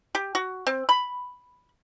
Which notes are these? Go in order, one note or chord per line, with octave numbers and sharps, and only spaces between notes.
G4
F#4
C4
B5